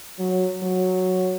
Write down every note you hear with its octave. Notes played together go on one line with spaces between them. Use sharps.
F#3
F#3